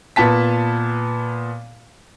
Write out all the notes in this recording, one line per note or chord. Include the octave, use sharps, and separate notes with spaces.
A#2 B3 A5 B6